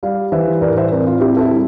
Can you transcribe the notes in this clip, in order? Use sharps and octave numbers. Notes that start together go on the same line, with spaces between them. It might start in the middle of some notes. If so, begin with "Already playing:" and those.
G3 D5 F5
E3 C5 E5
A2 A#4 D5
C5 E5
C4 A#4 D5
F4
C4 E4 G4
A4
E4 G4
G3